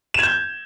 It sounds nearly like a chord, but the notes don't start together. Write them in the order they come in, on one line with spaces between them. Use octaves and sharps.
E7 G#6 G6